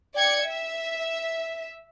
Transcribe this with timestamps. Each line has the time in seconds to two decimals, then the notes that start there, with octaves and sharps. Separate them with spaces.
0.15 D5 G5 G#6 C#7
0.46 E5